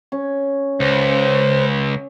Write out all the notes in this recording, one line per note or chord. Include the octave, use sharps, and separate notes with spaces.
C#4
C#2 C5